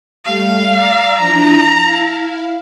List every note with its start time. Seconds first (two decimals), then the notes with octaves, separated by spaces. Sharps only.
0.25 G3 A3 F5
0.74 D5 A#5 E6
1.18 F3 D4 E4 A#5
1.82 E4 F5